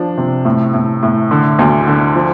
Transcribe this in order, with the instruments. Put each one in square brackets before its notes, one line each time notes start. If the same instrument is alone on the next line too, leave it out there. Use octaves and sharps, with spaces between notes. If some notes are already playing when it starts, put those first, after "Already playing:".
Already playing: [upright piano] F3 D4
C3
A2
A2
A2
D3
D2
D3
F3